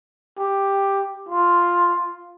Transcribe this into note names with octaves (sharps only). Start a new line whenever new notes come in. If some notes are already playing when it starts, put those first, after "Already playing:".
G4
F4